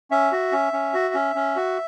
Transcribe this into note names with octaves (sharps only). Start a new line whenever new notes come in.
C#4 E5
F#4
C#4
C#4
F#4
C#4
C#4
F#4